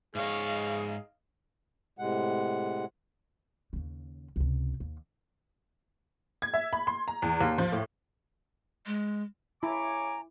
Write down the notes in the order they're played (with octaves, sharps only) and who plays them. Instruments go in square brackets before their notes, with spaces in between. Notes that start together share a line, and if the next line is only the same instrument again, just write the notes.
[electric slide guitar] G#2 C#5 [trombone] G#4 [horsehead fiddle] D#5 F5
[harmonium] A2 C3 G#3 F#5
[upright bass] D#2 C#3
C#2 C3
D#2
[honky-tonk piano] G#6
E5
B5
C6
A#5
E2
D#2
F3
A2
[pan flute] G#3
[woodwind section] C#3 C#5 D6 [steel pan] E4 [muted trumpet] G#5 [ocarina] A#5